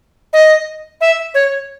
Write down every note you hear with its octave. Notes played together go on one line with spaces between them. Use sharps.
D#5
E5
C#5